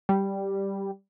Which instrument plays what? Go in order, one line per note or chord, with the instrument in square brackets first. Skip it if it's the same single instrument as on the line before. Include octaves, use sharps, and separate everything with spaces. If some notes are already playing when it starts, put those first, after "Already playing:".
[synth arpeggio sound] G3